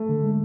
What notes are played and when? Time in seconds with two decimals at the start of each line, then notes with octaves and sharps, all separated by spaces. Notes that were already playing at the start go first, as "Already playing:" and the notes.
Already playing: A3
0.09 D3
0.23 G#3